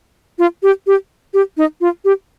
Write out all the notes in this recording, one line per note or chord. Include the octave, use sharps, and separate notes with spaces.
F4
G4
G4
G4
D#4
F4
G4